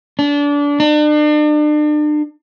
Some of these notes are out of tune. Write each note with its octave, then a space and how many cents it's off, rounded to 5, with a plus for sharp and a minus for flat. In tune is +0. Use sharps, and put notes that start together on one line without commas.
D4 -25
D4 +40